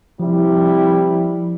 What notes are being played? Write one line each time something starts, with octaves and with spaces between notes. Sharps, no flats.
C3 F3 G3 E4